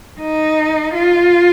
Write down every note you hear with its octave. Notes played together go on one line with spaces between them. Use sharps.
D#4
F4